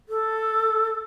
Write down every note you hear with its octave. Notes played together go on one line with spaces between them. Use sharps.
A4